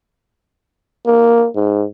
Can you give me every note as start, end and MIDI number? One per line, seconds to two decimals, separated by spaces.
1.06 1.47 58
1.55 1.86 44